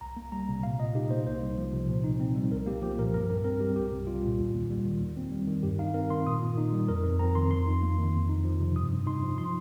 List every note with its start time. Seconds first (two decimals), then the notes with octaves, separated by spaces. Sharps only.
0.01 C2 A#5
0.17 A#3
0.32 G3 A#5
0.49 C3
0.63 A#2 F5
0.80 A#2 D#5
0.95 D#4 G4
1.10 A#3 C5
1.27 C2 C5
1.42 C2
1.58 F3
1.73 C3
1.89 A#2
2.04 D#4
2.20 C4
2.36 G3
2.51 C2 A#4
2.66 A#3 G4
2.82 F3 G4
2.98 A#2 A#4
3.14 G2 A#4
3.29 G2 A#4
3.44 C4 A#4
3.61 G3 G4
3.76 C2 G4
3.92 C2
4.07 G3 F4
4.24 A#2
4.38 D#2
4.55 D#2
4.71 G3
4.85 D#3
5.01 D#2
5.17 C4
5.32 G3
5.47 D#3
5.63 G2 G4
5.79 D#4 F5
5.94 C4 A#4
6.10 D#3 C6
6.26 A#2 D#6
6.41 A#2
6.58 D#4
6.72 G3
6.88 F2 A#4
7.04 F2 A#4
7.19 C4 A#5
7.35 D#3 C6
7.51 F2 C6
7.67 D#4
7.83 A#3
7.98 D#3
8.13 F2
8.29 D#4
8.44 F3
8.60 C3
8.76 G2 D#6
8.92 G2
9.06 D#4 C6
9.23 F3
9.38 C6